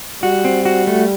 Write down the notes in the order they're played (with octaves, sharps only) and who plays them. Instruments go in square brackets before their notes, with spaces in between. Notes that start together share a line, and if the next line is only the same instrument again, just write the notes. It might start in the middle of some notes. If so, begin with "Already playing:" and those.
[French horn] G3 [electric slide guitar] F#4
[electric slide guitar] C4
F#4
A3